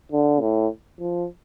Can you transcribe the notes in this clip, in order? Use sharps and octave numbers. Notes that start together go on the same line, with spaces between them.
D3
A2
F3